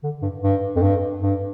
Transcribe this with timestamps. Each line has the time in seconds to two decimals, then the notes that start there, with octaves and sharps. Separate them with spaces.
0.03 D3
0.22 G2
0.43 G2
0.76 F2
0.82 G2
1.22 G2